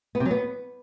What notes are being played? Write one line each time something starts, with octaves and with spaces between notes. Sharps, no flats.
B3
C3
F#3
B3